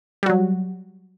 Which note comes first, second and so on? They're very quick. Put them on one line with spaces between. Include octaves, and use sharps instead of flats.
G3 F#4 F#3